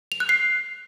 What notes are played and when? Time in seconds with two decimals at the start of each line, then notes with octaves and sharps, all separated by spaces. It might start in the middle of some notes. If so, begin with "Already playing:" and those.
0.12 F7
0.20 F#6
0.29 C7